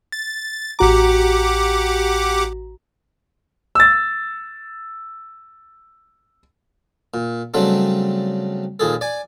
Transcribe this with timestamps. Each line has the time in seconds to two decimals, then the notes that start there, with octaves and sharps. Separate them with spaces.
0.12 A6
0.79 A1 F#4 G4 F#5 A#5 D6
3.75 E6 A6
7.14 A#2
7.54 C#3 F#3 G3 A3 C4 D4
8.80 D#2 A#2 G#4 A4
9.01 D5 G#5